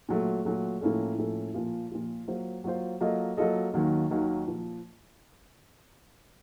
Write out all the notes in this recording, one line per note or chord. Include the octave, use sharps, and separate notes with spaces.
A#2 F#3 A3
A#2 F#3 A3
A2 F3 A#3 C#4 A4
A2 F3 A#3 C#4 A4
A#2 F3 A#3 F4
A#2 F3 A#3 F4
F#3 A#3 F4 C5
F#3 A#3 F4 C5
F#3 A#3 F4 A4 D#5
F#3 A#3 F4 A4 D#5
D#2 D#3 F#3 A#3
D#2 D#3 F#3 A#3
A#2 F3